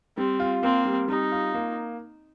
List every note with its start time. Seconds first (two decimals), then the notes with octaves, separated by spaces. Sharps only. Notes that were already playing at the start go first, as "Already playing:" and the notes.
0.17 G3 C4
0.40 F4
0.63 A#3 C4
0.85 G3
1.08 G3 D#4
1.32 F4
1.54 A#3